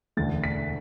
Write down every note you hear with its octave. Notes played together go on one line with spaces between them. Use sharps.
E1 D2 D3 A3 A6
B6